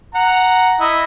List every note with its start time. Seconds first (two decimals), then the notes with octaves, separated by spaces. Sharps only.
0.15 F#5 A#5
0.80 E4 D#5